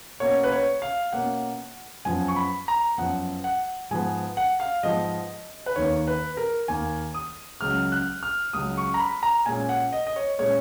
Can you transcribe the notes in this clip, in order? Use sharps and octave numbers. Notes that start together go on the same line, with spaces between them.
B2 A#3 C#4 C#5
B4
C#5
F5
B2 A#3 C#4 F#5
F#2 F3 B3 G#5
C#6
B5
A#5
F#2 F3 B3 F#5
F#5
G#2 F3 B3 G#5
F#5
F5
G#2 F3 B3 D#5
B4
D#2 D#3 A#3 C#5
B4
A#4
D#2 D#3 A#3 G#5
D#6
C#2 C#3 F#3 F6
F#6
F6
C#2 C#3 F#3 D#6
C#6
A#5
B5
A#5
A#2 G#3 C#4 G#5
F#5
D#5
D#5
C#5
A#2 G#3 C#4 C#5